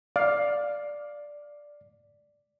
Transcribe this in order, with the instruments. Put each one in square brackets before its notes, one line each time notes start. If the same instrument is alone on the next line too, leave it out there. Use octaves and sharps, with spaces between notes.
[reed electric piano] D5 [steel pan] F5